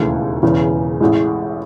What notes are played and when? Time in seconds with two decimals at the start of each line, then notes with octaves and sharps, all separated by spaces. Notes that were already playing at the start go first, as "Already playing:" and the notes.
Already playing: E1 D#2 C#3 E3 A3
0.43 E1 E2 C#3 E3
1.00 A1 A2 G#3